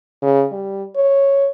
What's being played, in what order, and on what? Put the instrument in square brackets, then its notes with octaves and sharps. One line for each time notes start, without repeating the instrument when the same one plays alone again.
[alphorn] C#3
G3
C#5